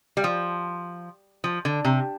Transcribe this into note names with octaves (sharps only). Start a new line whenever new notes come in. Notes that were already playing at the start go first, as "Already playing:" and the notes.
G3
F3
F3
D3
C3